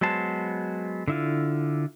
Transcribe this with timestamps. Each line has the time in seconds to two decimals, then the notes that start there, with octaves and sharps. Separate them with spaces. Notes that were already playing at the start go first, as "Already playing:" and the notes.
0.01 F#3 G#3 B3 C5 A5
1.08 D3 E4 F4